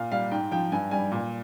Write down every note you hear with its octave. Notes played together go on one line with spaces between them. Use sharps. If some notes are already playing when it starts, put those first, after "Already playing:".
Already playing: A#2 F5
G3 F5
G#2 G5
F3 G5
G2 G#5
G3 G#5
A#2